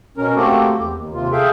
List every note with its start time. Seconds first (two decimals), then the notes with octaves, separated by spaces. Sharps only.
0.17 B2 C#4 A#4
0.36 A3 A#3 C4 F#4 G4 A4
0.77 E2 G4
0.95 D#2
1.13 D#2 C3 F4
1.32 G#4 A4 E5 F5 G5